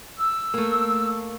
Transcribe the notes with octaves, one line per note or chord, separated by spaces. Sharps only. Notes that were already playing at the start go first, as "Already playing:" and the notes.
E6
A3 A#3